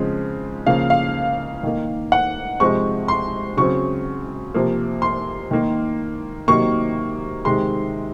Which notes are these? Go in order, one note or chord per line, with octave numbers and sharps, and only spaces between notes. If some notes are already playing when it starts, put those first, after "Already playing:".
Already playing: C#3 F3 G#3 C4
C#3 F3 A#3 F5
F5
D#3 A#3
F#5
C3 F3 G#3 C4 C#6
C6
C#3 F#3 C4 C#6
C3 F3 A#3
C6
D#3 A#3
C3 D#3 F#3 A#3 C#6
C3 D#3 G#3 C6